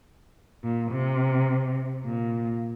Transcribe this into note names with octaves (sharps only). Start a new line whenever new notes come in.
A#2
C3
A#2